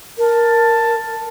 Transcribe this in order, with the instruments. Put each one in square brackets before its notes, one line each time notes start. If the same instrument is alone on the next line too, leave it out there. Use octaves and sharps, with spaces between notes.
[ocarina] A#4 [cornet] A5